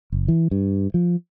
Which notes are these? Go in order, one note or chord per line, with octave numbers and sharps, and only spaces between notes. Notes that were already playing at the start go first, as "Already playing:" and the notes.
F#1
E3
G2
F3